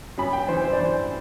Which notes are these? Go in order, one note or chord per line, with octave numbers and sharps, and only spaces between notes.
F#2 B5
G5
E3 C5
C5
D5
E3 C5